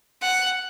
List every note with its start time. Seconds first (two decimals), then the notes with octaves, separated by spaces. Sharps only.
0.22 F#5